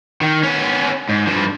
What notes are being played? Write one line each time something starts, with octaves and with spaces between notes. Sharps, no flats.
D#3
B3 C#4
G#2
G2 F3